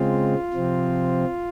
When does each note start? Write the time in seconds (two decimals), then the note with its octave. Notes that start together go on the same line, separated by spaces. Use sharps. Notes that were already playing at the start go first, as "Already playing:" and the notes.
Already playing: C#3 G#3 C4 F4
0.53 C3 F3 C4